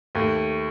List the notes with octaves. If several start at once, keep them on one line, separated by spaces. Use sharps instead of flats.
D#2 A3